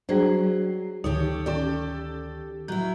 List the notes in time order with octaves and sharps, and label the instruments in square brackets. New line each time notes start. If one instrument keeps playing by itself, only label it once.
[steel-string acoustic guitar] F#3 [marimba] G3 G#4 C5 [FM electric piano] D4 C7
[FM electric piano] D2 D#3 [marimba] D#4 [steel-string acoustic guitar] G4 A4 C#5
[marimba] C#4 D5 [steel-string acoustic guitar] G4 A4
[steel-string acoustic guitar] F#3 E4 [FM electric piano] G6